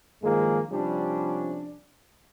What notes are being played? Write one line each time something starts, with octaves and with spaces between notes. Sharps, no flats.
G2 D#3 F3 G#3 A#3 G#4
C3 F3 G3 C#4 D4